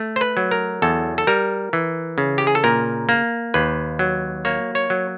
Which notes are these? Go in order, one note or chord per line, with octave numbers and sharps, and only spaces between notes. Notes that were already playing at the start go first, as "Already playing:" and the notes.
Already playing: A3
C5
B4
F#3
A#4
E2 A4
A4
G3 A#4
E3
C#3
G4
G#4
A4
A#2 A#4
A#3
D#2 B4
F#3
A#3 C#5
C#5
F#3